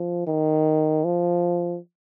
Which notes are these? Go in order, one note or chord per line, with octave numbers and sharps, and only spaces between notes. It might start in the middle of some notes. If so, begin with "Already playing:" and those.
Already playing: F3
D#3
F3